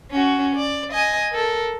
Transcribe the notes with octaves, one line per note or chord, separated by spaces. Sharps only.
C#4 F#4
D5
D#5 G#5
A4 A#4